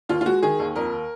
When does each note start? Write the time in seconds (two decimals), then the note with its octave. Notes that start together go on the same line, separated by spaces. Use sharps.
0.09 D#2 F4
0.21 F4
0.26 G#3 F#4
0.43 D#3 G#4
0.59 D#2
0.76 F2 A#4